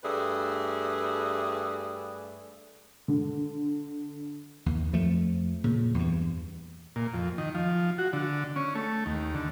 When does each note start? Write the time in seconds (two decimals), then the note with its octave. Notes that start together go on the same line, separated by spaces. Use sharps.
0.04 G2 A3 G#4 B4 D5
3.08 D3
4.66 D#2
4.93 F2 F3 A3
5.64 A#2 C#3
5.94 E2 G2
6.96 A#2
7.14 F2
7.38 D#3
7.55 F3
7.98 F#4
8.13 D3
8.56 C#4
8.75 A3
9.06 D#2
9.35 D3